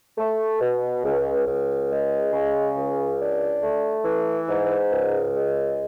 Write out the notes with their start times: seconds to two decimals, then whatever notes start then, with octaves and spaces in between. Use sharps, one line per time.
0.18 A3
0.60 B2
1.04 C#2
1.47 C#2
1.90 G#3
2.33 C#3
2.76 C#2
3.19 D4
3.62 A3
4.05 E3
4.48 G#2
4.91 C#2
5.35 G#3